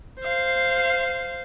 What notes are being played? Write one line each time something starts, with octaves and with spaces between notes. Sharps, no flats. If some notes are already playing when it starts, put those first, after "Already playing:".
C5 F5